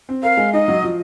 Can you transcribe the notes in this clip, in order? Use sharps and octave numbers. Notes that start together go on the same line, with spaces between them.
C4
A#4 F5
G#3
D#4 D#5
F#3
F3